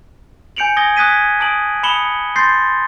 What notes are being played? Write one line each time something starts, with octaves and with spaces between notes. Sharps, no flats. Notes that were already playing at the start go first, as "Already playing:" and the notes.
G#5 G6 C#7 D7 F7 F#7
G#5 D#6 G#6 A#6 G7
D#6 F#6 G#6 B6 D#7
A5 D#6 D7 F#7
B5 D#6 C#7 E7 F#7 G7
C6 G6 A6 A#6 C7